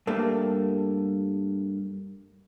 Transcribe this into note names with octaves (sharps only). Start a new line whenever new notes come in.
G2 A3 A#3